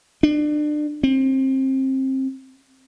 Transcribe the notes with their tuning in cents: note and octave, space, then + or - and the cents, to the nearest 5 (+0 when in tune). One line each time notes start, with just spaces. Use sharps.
D4 +30
C4 +25